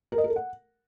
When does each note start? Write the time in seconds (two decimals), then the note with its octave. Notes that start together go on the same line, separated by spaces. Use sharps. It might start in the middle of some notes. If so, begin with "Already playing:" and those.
0.12 A#4
0.18 D#5
0.24 A#4
0.30 A4
0.36 F#5